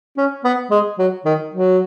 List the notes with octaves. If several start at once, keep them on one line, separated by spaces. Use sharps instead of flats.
C#4
B3
G#3
F#3
D#3
F#3